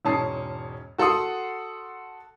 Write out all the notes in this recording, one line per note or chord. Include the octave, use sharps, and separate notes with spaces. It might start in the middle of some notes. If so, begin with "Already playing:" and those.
E1 G#2 C#4 A5 D#6 C7
F#4 A4 F#5 C6 D#6